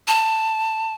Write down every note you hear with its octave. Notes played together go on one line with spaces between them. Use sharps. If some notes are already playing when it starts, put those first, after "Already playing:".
A5